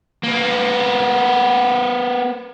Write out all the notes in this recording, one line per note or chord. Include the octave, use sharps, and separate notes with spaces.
A#3 B3